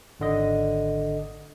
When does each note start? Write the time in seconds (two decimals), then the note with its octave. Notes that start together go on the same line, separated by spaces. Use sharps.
0.20 G#1 D3 D#5